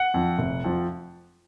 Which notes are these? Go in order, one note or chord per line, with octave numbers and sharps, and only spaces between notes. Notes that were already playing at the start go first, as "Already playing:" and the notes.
Already playing: F#5
F2 F3
F1
F2 F3